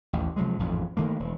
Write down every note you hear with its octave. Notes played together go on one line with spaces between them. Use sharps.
A1 D#2
C3 F3 F#3 G#3
A1 F2 G#2
D#3 A3 A#3
E1